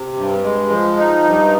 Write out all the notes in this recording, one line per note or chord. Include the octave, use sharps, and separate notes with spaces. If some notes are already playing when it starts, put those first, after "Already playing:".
Already playing: C3
G2
G#3
F3
D#4
G2